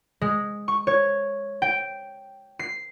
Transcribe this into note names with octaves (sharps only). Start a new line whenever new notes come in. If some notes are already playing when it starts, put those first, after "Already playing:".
G#3
C#6
C#5
G5
C7